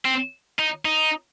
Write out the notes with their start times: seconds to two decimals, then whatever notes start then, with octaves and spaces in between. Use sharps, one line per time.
0.05 C4
0.59 D#4
0.85 D#4